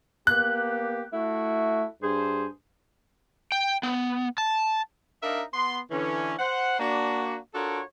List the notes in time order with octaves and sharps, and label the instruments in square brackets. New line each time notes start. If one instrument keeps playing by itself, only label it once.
[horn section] A#3 B3 G4 [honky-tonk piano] F#6
[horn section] A3 E4 F#4
G2 G#4 C5
[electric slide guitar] G5
B3
A5
[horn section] D4 D#4 A#4 E5 F5
B3 C6
D3 E3 C#4
C5 F#5
A#3 D4 F#4
D4 F4 F#4 A4 A#4 C#5